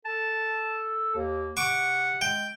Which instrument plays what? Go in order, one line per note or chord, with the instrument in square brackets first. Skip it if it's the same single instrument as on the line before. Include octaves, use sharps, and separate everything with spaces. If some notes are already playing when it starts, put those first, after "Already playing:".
[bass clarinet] A4 [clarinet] A5
[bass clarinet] D#2 [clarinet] A#3
[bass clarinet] C3 [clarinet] F#5 [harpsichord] C#6 D6
[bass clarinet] G#3 [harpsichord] G5